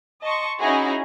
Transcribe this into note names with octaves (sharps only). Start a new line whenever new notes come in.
D#5 A5 C6 C#6
C#4 D#4 E4 F#4 G#4